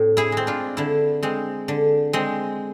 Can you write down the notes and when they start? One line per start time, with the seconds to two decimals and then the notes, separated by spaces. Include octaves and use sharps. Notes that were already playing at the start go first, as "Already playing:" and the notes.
Already playing: A2 C4
0.17 E4 G#4
0.32 G#3 C4
0.47 D4 F4
0.77 D3 E4
1.23 G#3 C4
1.68 D3
2.13 G#3 C4